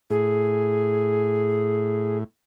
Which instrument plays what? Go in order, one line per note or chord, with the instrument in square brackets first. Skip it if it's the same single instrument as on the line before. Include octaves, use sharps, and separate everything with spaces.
[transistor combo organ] A2 [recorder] G#4